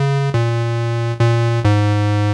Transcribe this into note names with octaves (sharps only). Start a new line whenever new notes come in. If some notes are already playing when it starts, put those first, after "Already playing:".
Already playing: C#3
A#2
A#2
G#2